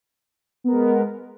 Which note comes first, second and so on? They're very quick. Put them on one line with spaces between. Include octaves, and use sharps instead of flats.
B3 A#4 G#3